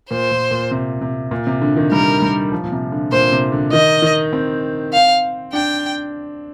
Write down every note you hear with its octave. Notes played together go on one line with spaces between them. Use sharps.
A#2 C5
A#2
A#2
C3
C3
A#2
C3
D3
D#3
G3 A#4
G3
F3
A#2
C3
D3
A#2 C5
C3
D3
D#3 D#5
D#3
C4
F5
D4 G5